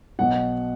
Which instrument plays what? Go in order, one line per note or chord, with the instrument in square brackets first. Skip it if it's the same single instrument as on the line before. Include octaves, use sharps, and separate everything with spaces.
[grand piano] B1 B2 F#5